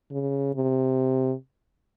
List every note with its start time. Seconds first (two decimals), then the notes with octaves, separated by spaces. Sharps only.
0.11 C#3
0.55 C3